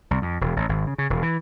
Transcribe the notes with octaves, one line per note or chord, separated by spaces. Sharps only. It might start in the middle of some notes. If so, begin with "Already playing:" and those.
C2
F2
E1
A1
G#1
C#3
C#3
E1
E3